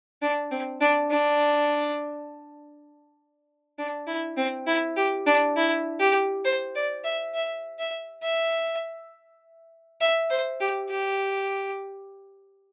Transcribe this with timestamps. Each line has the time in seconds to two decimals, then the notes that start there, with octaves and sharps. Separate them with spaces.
0.22 D4
0.51 C4
0.81 D4
1.11 D4
3.78 D4
4.07 E4
4.37 C4
4.67 E4
4.97 G4
5.26 D4
5.56 E4
6.00 G4
6.45 C5
6.75 D5
7.04 E5
7.34 E5
7.79 E5
8.23 E5
10.01 E5
10.30 C5
10.60 G4
10.90 G4